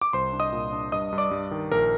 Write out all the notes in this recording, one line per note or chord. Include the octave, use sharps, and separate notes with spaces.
D6
C2 C5 C6
D4
D#5 D#6
A#2
D4
G2 D#5 D#6
G2
D5 D6
G2
D#3
A#1 A#4